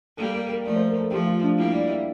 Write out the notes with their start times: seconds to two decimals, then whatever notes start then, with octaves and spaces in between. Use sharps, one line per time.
0.17 G3 A#3 A4
0.34 A#4
0.49 A#4
0.64 F3 A3 D5
0.76 C5
0.88 A#4
0.99 A4
1.10 F3 A3 G4
1.27 F4
1.42 D4
1.57 G3 A#3 E4
1.73 D5
1.88 E5